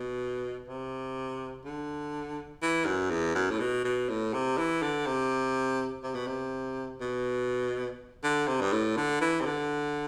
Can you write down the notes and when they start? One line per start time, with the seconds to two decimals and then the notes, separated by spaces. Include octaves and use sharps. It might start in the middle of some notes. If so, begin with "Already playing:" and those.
Already playing: B2
0.68 C3
1.65 D3
2.62 E3
2.86 F#2
3.10 E2
3.35 F#2
3.51 A2
3.60 B2
3.85 B2
4.09 A2
4.33 C3
4.58 E3
4.82 D3
5.07 C3
6.04 C3
6.15 B2
6.27 C3
7.01 B2
8.24 D3
8.48 C3
8.61 G2
8.72 A2
8.97 D3
9.21 E3
9.41 C3
9.46 D3